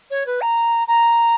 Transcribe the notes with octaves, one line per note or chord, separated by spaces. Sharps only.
C#5
B4
A#5
A#5